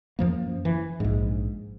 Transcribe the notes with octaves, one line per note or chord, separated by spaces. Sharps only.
F#2 F3 A#3
E3
A#1 G#2